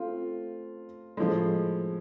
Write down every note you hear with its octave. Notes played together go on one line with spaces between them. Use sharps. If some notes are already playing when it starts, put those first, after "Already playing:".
Already playing: A3 C4 F4
A2 F3 G#3